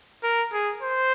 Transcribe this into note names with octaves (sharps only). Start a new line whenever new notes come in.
A#4
G#4
C5